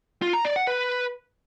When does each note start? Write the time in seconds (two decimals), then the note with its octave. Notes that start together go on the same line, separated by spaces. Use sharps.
0.22 F4
0.33 A#5
0.45 D5
0.56 F#5
0.67 B4